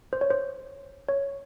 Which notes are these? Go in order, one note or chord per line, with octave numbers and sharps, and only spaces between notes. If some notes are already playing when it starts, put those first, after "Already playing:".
C5
C#5
C5
C#5